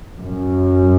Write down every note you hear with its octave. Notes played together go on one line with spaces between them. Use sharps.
F#2